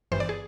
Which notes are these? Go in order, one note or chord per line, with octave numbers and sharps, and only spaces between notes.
G1 G2 E3 C5
D5
G#4